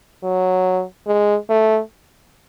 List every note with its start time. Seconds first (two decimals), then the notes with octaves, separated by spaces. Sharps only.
0.24 F#3
1.07 G#3
1.50 A3